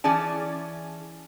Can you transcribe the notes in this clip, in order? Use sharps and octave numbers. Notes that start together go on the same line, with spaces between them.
E3 C#4 G#4 D5 A5